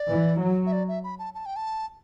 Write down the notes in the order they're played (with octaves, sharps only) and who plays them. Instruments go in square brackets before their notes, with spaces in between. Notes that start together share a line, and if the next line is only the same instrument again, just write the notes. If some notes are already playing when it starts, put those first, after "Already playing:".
Already playing: [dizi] D5
[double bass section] E3
F#3
[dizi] E5
D5
E5
B5
A5
A5
G5
A5